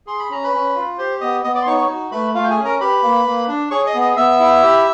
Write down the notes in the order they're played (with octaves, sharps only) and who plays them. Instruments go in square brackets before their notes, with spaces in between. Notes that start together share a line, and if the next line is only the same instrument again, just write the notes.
[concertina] G#4 C6
B5
C#4 A#5
B4 B5
C#4
F4
G4 C5 C6
B3 D#5 D#6
B3 D#5 D#6
D5 D6
C6
D#4 C#5 C#6
C#5 C#6
F#4
A3 B4 B5
A3 F4 F5
G5
G#4 G#5
C#4
A#4 A#5
G4 B4 B5
A#3
A#3
D4
G#4 C#5 C#6
D#5 D#6
B3
D#5 D#6
B3 E5 E6
E4
G4